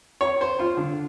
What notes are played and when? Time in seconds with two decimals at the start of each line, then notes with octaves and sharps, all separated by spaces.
0.21 C#5
0.41 C5
0.59 F4
0.77 D3